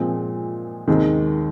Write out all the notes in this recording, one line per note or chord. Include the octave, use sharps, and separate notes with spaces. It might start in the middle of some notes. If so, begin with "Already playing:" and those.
Already playing: A#2 F3 G#3 C4
D#2 D#3 G#3 C4